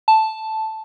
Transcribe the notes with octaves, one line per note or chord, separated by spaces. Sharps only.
A5